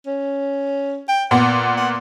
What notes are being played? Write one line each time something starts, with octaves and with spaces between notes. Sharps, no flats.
C#4
G5
A#2 B3 F#5
F#5